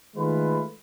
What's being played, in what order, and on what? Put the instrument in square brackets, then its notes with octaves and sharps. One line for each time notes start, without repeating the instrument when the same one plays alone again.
[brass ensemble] D#3 G#3 A3 F4 B4